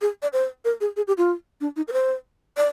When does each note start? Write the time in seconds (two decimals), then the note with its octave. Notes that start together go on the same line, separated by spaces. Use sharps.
0.02 G#4
0.22 D5
0.33 C5
0.65 A#4
0.81 G#4
0.97 G#4
1.07 G4
1.18 F4
1.61 D4
1.76 D#4
1.88 A#4
1.93 C5
2.57 D5